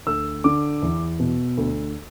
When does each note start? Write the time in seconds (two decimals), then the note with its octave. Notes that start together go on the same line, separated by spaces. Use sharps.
0.07 D2 E6
0.44 D3 D6
0.82 E2
1.19 B2
1.57 D2